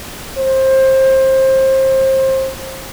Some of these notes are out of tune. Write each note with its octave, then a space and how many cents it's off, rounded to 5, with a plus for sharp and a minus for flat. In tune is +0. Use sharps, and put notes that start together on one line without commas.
C5 +25